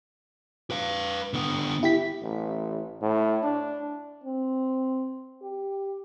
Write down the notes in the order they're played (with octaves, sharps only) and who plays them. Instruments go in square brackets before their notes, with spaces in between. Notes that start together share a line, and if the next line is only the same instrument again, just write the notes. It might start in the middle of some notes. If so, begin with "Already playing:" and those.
[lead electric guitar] B4 F5
D3 B3
[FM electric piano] E4 G4 B6
[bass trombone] A1
A2
D4
[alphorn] C4
G4